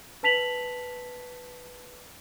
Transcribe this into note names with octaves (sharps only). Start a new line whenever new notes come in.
B4 A5 B6 F7 F#7